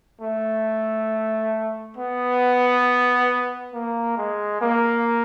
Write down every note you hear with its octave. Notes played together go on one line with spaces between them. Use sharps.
A3
B3
A#3
G#3
A#3